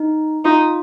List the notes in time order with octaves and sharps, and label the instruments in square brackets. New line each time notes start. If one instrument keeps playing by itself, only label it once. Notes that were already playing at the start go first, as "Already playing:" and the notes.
Already playing: [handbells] D#4
[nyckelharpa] D#4 [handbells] F4